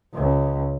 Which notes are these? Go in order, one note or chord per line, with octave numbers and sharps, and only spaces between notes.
C#2